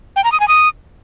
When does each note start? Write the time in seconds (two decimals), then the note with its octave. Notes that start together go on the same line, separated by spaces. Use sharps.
0.16 G5
0.24 A#5
0.32 D#6
0.40 G#5
0.48 D#6